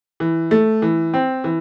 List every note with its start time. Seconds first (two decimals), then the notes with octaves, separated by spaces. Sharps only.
0.20 E3
0.51 A3
0.82 E3
1.14 C4
1.44 E3